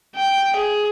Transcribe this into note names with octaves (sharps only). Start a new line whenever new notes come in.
G5
G#4